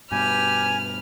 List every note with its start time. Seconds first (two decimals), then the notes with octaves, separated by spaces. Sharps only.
0.12 G2 B2 G4 B4 G#5 F6